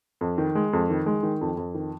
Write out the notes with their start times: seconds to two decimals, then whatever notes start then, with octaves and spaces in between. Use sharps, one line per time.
0.21 F2
0.38 D#3
0.55 G#3
0.73 F2
0.90 D#3
1.06 G#3
1.23 D#3
1.41 F2
1.57 F2
1.75 D#3